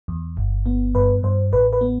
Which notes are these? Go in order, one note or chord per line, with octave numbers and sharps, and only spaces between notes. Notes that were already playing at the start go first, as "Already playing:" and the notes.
E2
G1
B3
G2 B4
G2 C5
A1 B4
B4
B3